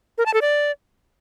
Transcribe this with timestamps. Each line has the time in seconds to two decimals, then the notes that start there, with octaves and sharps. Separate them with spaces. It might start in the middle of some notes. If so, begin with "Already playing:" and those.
0.18 A#4
0.26 A5
0.34 A4
0.41 D5